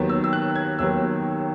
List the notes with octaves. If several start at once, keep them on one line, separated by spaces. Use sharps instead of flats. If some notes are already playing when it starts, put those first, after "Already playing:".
Already playing: D#2 D#3 F#3 B3
E6
E6
F#6
G#6
D#2 D#3 F#3 B3 E6